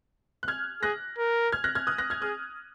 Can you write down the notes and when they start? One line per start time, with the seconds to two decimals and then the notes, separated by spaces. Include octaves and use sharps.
0.43 F#6
0.48 F6 G#6
0.82 G#4 F#6 A#6
1.18 A#4
1.52 F6 G#6
1.64 F#6 A#6
1.75 F6 G#6
1.87 D#6 F#6
1.98 F#6 A#6
2.10 F6 G#6
2.22 G#4 D#6 F#6